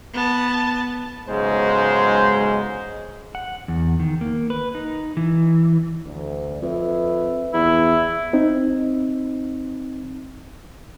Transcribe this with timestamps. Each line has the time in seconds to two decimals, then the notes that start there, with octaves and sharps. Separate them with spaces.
0.13 B3 A5
1.28 B1 G#2 C#3 G#3 C5
3.35 F#5
3.68 E2
4.00 D#3
4.21 A#3
4.50 B4
4.75 D#4
5.17 E3
6.06 D2
6.62 F2 B4 E5
7.53 E2 E4
8.33 C4 D#4